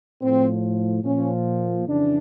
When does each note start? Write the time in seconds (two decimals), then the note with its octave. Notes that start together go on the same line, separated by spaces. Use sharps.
0.21 A2 F3 C4
1.04 A#2 F3 C#4
1.88 F2 C#3 E3 D4